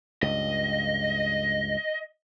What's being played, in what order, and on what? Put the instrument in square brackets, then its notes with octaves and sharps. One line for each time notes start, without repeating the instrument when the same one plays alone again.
[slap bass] C#2 G2 [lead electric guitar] D#5